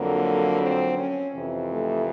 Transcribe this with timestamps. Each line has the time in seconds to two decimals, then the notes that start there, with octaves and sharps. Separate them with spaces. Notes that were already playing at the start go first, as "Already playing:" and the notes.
Already playing: F2 D3 F#3 A#3
0.62 C4
0.98 C#4
1.34 F2 C3 E3
1.70 A3